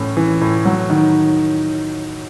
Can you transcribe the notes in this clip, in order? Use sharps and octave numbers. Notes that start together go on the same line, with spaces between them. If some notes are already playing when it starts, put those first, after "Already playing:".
Already playing: A2 E3 C#4
E3
A2
F#3
D#3